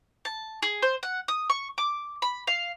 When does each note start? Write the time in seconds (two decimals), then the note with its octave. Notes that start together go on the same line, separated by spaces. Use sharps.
0.25 A5
0.63 G#4
0.82 C5
1.03 F#5
1.28 D#6
1.50 C#6
1.78 D6
2.22 B5
2.47 F5